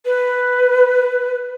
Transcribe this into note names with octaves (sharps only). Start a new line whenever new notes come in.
B4